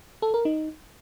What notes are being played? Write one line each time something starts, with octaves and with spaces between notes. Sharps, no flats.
A4
A#4
D#4